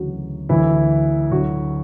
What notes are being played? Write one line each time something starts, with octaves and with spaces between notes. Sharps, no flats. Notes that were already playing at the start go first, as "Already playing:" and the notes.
Already playing: D2 C#3 E3 F#3 F#4
D2 D3 E3 F#3 E4
D2 D3 F#3 F#4